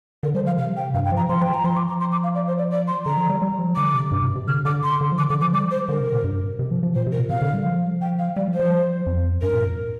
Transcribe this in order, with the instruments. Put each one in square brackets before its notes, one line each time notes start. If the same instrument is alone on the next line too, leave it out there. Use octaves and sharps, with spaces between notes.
[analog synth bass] D3 [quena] A#4
[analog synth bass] G3 [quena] C5
[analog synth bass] F3 [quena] F5
[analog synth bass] C3 [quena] F5
[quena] G5
[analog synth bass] G2 [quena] F5
[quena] G5
[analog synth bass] F3 [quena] A#5
[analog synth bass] F3 [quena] C6
[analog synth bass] F3 [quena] G5
[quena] A#5
[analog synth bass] F3 [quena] C6
[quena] D6
A#5
C6
D6
F5
D5
C5
D5
D5
C6
[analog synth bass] D3 [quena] A#5
[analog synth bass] F3
G3
G3
F3
[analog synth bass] D3 [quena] D6
[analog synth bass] C3
G2
C3
C3
[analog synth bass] D3 [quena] F6
[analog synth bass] D3 [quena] D6
[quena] C6
[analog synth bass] D3
F3
[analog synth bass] D3 [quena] D6
[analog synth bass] D3 [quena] D6
[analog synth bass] F3 [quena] D6
[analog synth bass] G3 [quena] D6
[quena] C5
[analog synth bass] D3 [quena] A#4
[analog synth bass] C3
A#2
G2
C3
F3
F3
[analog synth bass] A#2 [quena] C5
[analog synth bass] C3
[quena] A#4
[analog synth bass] A#2
[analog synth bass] C3 [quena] F5
[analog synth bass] D3
G3
F3
[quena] G5
F5
[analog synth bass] G3 [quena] D5
[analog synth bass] F3
[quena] C5
[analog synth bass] F3
F2
[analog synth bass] G2 [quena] A#4
[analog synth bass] A#2
F2